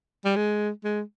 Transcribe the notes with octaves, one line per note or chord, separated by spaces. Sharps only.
G3
G#3
G#3